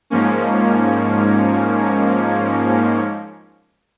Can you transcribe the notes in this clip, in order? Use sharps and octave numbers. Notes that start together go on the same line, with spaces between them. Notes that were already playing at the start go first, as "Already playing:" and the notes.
G#2 F3 A#3 C#4